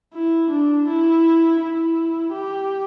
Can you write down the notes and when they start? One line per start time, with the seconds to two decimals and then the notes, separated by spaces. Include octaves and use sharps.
0.14 E4
0.50 D4
0.88 E4
1.61 E4
2.33 G4